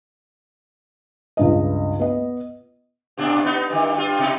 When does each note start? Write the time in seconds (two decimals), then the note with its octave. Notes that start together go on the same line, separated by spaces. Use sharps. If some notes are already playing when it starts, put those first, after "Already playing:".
1.37 C#2 G2 D#5
2.00 B3 D#5
3.18 G2 A#2 D4
3.44 B3 D#4
3.70 G2 D#3
3.94 G2 F4
4.19 B2 D#4